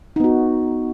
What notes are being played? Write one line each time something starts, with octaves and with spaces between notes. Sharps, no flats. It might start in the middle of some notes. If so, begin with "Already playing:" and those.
B3 D#4 F#4